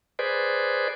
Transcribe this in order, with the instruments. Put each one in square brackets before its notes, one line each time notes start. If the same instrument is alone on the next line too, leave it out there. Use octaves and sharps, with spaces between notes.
[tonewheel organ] G#4 B4 C5 D5